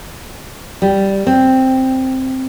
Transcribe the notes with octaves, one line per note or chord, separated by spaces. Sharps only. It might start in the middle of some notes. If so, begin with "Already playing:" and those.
G3
C4